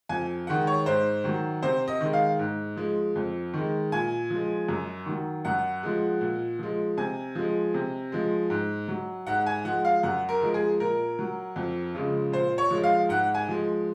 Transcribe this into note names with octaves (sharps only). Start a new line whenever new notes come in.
F2 G#5
D#3 G#3 F#5
C#5
G#2 C5
D#3 F#3
C3 C5
D#5
D#3 G#3
F5
G#2
F3 G#3
F2
D#3 G#3
A#2 G#5
F3 G#3
F#2
D#3 F#3
F#2 F#5
F3 G#3
A#2
F3 G#3
C3 G#5
F3 G#3
C3
F3 G#3
G#2
F#3
G#2 F#5
G#5
F3 G#3 F#5
F5
F#2 F#5
A#4
F3 G#3
G#4
A#2 A#4
F#3
F2
C#3 F3 G#3
A#2 C5
C#5
F3 G#3
F5
G#2 F#5
G#5
F3 G#3